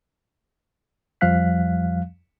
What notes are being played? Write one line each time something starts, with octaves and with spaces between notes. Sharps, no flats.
F2 F3 G3 F5 F#6 B6